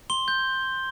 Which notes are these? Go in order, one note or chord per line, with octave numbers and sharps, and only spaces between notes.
C6 G7
G6